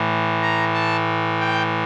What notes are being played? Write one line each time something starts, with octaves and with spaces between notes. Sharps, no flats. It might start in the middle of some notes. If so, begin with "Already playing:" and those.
Already playing: A2 E3
A#5
A5
G5